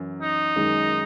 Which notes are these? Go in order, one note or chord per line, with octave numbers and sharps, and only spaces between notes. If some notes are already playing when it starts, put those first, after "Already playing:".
Already playing: F#2 E3
D#4
F#2 D#3 G#3